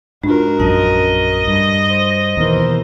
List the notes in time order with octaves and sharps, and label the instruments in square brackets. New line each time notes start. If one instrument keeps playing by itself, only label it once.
[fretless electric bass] G#2 [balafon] D4 F4 [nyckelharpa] F#4 A#4
[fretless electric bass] A#1 F#2 [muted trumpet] D#5 [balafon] A5
[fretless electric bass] G2
[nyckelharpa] C5
[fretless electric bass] D#2 B2 E3 [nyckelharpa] A#4 C5